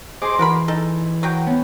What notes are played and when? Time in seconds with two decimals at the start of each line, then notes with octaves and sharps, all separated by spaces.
0.22 G#4 C5 D#5 C6 D6
0.39 E3 F#4 A#4 B5
0.68 D#4 A4
1.23 F#3 F#4 G5
1.47 B3 C#4